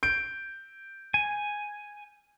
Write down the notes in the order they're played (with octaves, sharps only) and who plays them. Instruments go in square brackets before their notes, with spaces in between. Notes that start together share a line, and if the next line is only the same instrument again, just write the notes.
[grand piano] G6 D7
[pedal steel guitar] G#5